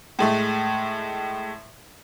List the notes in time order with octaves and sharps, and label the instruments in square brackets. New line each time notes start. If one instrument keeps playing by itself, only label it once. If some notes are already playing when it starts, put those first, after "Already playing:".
[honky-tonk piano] A2 G#3 A3